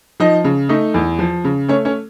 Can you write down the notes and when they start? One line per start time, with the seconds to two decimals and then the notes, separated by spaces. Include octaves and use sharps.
0.20 F3 D#4 D#5
0.44 C#3
0.69 A3 D#4 D#5
0.94 E2
1.19 F3
1.44 C#3
1.69 A3 C#4 C#5
1.85 C#4 C#5